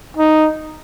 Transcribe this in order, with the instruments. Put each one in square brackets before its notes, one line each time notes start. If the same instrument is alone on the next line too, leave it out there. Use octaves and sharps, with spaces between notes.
[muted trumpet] D#4